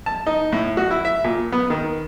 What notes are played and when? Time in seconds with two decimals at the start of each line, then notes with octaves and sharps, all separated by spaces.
0.06 A5
0.27 D#4
0.52 A2
0.77 F#4
0.91 E4
1.05 E5
1.24 A#2
1.52 B3
1.70 D#3